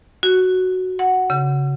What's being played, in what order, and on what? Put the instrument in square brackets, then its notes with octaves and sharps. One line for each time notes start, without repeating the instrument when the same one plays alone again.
[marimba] F#4
F#5
C#3